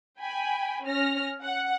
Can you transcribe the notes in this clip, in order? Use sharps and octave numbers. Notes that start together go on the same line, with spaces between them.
G5 G#5 B5
C#4 F6 A#6
F#5